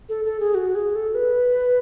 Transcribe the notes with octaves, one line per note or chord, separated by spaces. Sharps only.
A4
A4
G#4
F#4
G#4
A4
B4